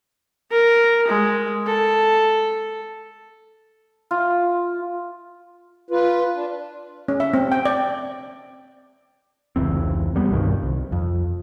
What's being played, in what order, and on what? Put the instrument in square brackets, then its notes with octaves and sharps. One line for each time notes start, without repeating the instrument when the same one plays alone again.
[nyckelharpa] A#4
G#3
A4
[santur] F4
[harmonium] F4 B4
D4
[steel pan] C#4
E5
C4
G5
D5
[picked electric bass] F1 C#2 E3 C4
D#2 G3 B3
C2 G2 B2 D#3
C2
F2